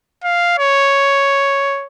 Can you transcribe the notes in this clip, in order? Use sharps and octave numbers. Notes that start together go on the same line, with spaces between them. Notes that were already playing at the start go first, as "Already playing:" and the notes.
F5
C#5